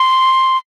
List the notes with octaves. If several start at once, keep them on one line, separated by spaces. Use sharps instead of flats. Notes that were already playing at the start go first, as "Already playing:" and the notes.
Already playing: C6